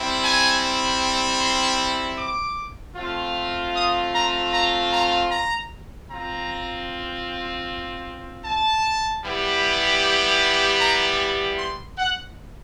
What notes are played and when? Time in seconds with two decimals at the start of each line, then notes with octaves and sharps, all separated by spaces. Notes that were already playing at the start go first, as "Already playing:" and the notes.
Already playing: G3 C4 E4
0.22 G#5
1.39 C6
2.17 D6
2.96 A3 C4 F4
3.74 D#6
4.13 A#5
4.53 A#5
4.92 A#5
5.31 A#5
6.09 C4 F4 A#5
8.45 A5
9.23 G3 B3 E4 G4
10.80 A#5
11.19 B5
11.58 C6
11.97 F#5